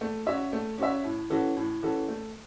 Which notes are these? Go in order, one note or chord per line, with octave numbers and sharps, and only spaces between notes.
A3
C#4 F#4 C#5 E5
A3
C#4 F#4 C#5 E5
A2
E3 C#4 F#4 A4
A2
E3 C#4 F#4 A4
A3